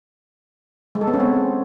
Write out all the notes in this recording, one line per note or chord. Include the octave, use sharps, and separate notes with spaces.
G#3
A4
B3
C#4
C4